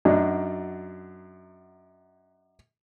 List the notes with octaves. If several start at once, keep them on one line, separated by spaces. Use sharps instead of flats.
F#2 F#3 D4 D#4